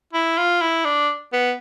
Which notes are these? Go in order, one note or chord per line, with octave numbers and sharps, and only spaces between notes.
E4
F4
E4
D4
B3